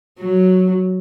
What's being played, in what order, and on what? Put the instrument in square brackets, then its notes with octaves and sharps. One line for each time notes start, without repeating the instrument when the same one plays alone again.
[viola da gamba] F#3